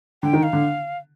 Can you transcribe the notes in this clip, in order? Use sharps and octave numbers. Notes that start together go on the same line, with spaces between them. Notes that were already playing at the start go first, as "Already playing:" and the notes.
D3 G5
D#3
F5
D3